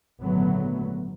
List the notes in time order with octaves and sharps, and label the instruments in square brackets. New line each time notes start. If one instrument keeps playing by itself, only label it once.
[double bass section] G#1 A#2 D3 F#3 A3 B3